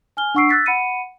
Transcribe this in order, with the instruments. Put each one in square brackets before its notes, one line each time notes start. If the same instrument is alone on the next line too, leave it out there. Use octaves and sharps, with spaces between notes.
[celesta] G#5 F6 G7
D4 F#5 C#6 E6 C7 D7
E6 F#6 A6 B6
F#5 B5 C#7 D#7